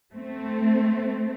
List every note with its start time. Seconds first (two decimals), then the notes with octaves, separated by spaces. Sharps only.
0.15 A3 C4